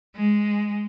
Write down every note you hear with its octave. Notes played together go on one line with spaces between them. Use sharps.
G#3